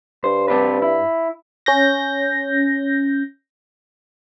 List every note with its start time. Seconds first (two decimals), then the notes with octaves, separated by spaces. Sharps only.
0.24 G2 C5
0.48 C4 D4 B4
0.82 E4
1.66 C#4 G6 A#6